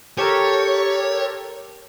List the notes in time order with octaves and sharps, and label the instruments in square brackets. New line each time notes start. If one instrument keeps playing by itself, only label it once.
[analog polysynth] G4 A4 A#4 [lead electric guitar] C#5